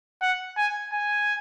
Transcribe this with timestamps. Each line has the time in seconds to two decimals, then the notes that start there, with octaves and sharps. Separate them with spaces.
0.22 F#5
0.57 G#5
0.93 G#5